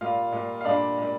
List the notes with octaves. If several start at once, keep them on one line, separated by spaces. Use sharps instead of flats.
A#2 G3 F4 F5
A#2 G3
F5
A#2 G3 D4 D5
A#2 G3